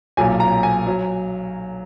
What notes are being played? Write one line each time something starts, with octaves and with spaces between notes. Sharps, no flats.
B1 A#2 F#3 G#5
A#5
G#5
F#3